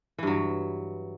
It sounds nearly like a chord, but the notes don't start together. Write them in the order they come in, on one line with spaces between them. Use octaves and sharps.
E3 G2 F#3